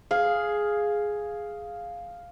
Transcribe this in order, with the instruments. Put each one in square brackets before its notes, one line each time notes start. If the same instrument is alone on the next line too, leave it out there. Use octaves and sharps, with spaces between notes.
[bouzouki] G#4 [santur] F5